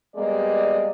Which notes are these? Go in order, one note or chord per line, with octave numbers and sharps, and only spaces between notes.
G3 G#3 A#3 B3 D5 D#5